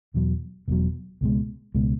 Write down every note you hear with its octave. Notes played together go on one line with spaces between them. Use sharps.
E1 E2 B2 F#3
E1 E2 B2 F#3
C#2 B2 G#3
C#2 B2 G#3